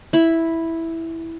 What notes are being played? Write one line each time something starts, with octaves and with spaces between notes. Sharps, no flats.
E4 B5